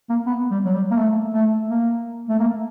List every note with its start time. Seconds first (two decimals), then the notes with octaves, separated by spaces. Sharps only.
0.10 A#3
0.26 B3
0.51 G3
0.65 F#3
0.74 G3
0.91 A#3
0.98 A3
1.34 A3
1.69 A#3
2.29 A3
2.40 A#3